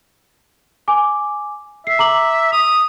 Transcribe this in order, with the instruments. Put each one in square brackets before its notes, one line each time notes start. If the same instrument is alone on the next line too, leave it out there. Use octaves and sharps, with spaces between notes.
[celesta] G#5 D6
[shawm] E5 [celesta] C7
[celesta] A#5 D6 F#7
[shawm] D#6 [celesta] F7